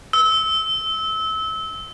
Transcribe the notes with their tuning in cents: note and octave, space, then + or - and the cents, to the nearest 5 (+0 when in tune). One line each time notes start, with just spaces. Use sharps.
E6 -30